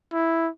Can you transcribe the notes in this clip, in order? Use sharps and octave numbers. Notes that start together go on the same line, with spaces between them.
E4